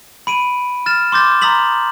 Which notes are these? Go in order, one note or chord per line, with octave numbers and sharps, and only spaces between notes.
B5 D7 D#7
F6 A6 E7
C6 D6 G6 A6
A#5 C6 D#6 A6 B6 F#7